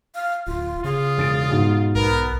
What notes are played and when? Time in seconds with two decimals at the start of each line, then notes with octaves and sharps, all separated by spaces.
0.15 F5
0.47 D1 F4
0.84 C#3 F4 G#4
1.17 E1 A6 D7
1.50 G#2 B2
1.95 B1 B3 A#4